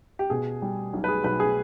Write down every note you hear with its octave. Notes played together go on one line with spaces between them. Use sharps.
G4
B2 G#4
G3
B1
B4
G#4
B1 B4
G#4